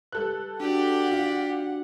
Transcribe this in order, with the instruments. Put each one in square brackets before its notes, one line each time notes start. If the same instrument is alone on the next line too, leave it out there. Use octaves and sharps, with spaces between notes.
[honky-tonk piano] G3 A4 F#6 [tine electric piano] B4
[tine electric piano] D4 F#4 [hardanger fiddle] G4 D5 [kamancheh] F#5
[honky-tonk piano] F4